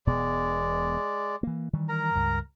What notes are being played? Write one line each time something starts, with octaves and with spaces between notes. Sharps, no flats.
E1 B2 G#3 B3 D5
E3 A#3
D#3 E3 G3
A#4 A#5
C#2 G2